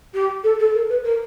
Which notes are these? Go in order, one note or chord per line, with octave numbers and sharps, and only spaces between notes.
G4
A4
A4
A#4
B4
A#4